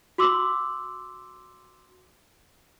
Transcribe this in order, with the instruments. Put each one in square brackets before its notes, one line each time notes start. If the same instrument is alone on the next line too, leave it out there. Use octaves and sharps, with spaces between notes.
[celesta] F#4 C6 D6 E6 F#7